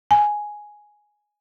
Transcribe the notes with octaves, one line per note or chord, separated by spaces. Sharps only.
G#5